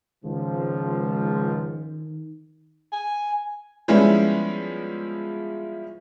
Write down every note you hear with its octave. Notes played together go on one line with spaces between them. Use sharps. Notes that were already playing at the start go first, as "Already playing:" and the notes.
C#2 G#2 D#3 F3
G#5
F3 G3 G#3 B3 C#4 E4